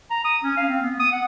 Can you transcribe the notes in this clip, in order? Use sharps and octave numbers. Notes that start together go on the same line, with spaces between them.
A#5
D#6
C#4
F5
C4
B3
D#6
F#5